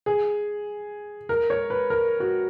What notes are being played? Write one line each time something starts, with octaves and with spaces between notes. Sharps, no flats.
G#4
A#4
C#5
B4
A#4
F#4